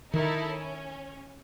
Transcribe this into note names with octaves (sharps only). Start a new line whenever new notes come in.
D#3 D#4 E4 A4
C#4